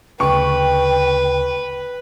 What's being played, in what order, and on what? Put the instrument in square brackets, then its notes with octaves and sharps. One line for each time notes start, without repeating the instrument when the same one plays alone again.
[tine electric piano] D2 C#3 [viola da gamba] B4 [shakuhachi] G5 [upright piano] C#6